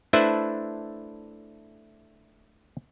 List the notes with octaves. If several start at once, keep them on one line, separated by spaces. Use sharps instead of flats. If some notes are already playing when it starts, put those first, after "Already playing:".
A3 D4 E4 B4 C5 E5